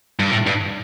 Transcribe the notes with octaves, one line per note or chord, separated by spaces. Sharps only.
G2
A2
G2